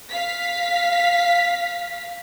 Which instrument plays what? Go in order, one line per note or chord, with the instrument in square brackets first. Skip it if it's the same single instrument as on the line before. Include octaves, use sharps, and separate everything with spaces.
[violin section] F5 B6